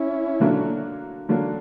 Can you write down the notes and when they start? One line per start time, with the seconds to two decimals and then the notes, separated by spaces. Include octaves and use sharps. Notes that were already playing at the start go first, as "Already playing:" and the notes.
Already playing: C#4 E4
0.40 D3 F#3 A#3 D4
1.29 D3 F#3 A#3 D4